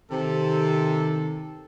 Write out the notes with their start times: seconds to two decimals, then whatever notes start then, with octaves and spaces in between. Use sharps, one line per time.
0.11 C3 D#3 A4